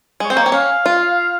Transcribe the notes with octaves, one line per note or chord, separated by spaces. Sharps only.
G#3 C#5
C4 C5
A#3 C#5
C4
C#4 F5
F4